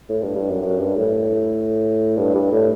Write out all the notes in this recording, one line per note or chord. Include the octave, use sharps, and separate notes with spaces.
A2
G2
G2
F#2
F#2
G2
A2
G2
G2
A2